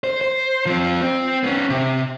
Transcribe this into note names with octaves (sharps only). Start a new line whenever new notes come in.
C5
C5
F3 C4
C4
B3 C#4
C3